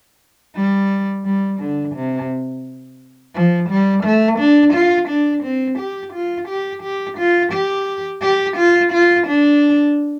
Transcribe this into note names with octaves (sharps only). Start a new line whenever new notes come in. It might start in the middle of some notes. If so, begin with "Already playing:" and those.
G3
G3
D3
C3
F3
G3
A3
D4
F4
D4
C4
G4
F4
G4
G4
F4
G4
G4
F4
F4
D4